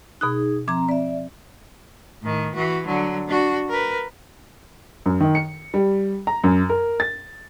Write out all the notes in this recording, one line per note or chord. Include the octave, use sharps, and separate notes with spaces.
B2 D#4 G#4 D#6 F#6
F3 C4 A#5 D6 G#6
C4 D5 E5
A2 D#3
E3 F#4
D3 F#3
D4 F#4
A#4 B4
F#2
D#3
C#7
G3
A#5
F#2
A#4
A6